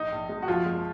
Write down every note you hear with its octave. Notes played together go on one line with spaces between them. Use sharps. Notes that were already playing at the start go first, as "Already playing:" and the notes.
Already playing: A#1 D#4
A#1
G#3
F#4
F#1 F3 F4
G#3